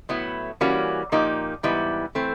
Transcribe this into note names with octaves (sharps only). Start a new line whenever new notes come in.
A2 F#3 B3 E4
E3 G3 A#3 C#4 F#4
A#2 F3 A#3 D#4 G4
G#2 E3 G3 B3 E4
E3 A3 C4